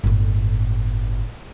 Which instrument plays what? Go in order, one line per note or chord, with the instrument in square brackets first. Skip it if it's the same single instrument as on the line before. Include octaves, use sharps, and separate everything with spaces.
[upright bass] G1 A2